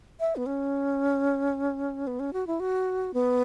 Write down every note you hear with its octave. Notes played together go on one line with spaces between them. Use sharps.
E5
B3
C#4
B3
C#4
F#4
E4
F#4
B3